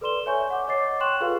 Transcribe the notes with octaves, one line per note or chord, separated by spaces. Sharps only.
A4 B4 D5 C6 E7 G7
C#5 E5 G#5 C#6 G6
F#5 D6
C#5 D#5 D6 A6 C7
G5 C6 C#6 F#6 E7 F#7
F4 G#4 A4 B4 F5